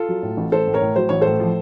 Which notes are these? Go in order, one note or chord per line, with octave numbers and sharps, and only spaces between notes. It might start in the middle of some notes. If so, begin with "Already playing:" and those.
Already playing: F4 A4
F#3
A2
A1
A1 A4 C5
A2
A#4 C#5
A2
F#3 C5
A1 C#5
A2 A4 C5
F3